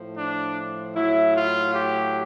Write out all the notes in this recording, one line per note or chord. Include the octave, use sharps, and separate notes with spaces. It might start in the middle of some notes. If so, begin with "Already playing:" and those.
Already playing: A2 F3
D4
A2 F#3 E4
F4
G4